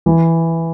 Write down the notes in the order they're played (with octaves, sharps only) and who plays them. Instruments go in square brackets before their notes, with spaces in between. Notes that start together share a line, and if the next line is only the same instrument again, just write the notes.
[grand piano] E3